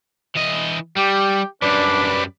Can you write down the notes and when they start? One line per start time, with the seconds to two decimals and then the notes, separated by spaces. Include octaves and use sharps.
0.35 E3 D#5
0.96 G3 G4
1.62 F#2 G3 D4 B4 D5